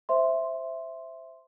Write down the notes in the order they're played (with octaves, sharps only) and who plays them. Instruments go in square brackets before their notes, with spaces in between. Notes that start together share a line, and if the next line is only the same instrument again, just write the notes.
[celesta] C5 E5 C6